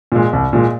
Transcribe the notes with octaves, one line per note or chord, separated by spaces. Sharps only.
A#2 G#3
C2
A#2 G#3